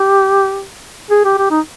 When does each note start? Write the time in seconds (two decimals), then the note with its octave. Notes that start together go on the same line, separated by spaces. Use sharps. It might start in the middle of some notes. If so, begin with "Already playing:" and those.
Already playing: G4
1.10 G#4
1.24 G4
1.38 G4
1.51 D#4